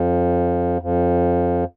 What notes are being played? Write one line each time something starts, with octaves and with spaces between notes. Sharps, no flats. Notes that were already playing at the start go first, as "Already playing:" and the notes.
Already playing: F2
F2